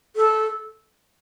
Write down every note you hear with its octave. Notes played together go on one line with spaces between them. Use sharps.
A4